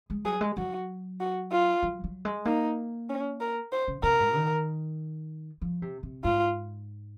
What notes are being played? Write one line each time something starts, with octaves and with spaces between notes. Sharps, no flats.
G#3
F#3 G#4
G#3
F#3 F#4
F#4
F4
F#3
F#3
G#3
A#3 D#4
C#4
A#4
C5
C#3
C3 A#4
G#2
D#3
F3
C3
C3
G#2 F4